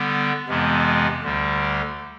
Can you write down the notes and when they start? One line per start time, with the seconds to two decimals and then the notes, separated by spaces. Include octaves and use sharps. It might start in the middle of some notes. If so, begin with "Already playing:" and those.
Already playing: D3 G3 B3
0.47 F2 C3 E3 G#3 B3
1.22 D2 D3 G3